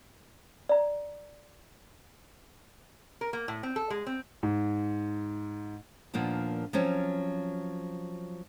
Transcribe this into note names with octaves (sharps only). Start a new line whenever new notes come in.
D5 A#5
A#4
A#3
A2
C4
A4
G#3
C4
G#2
D#2 A#2 F3 A#3 B3 D4
F3 F#3 C4 C#4